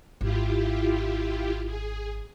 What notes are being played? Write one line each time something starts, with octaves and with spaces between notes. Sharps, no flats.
G#1 E4 F4 G4
G#4